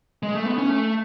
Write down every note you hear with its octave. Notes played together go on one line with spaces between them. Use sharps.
G#3
A3
B3
C#4
A3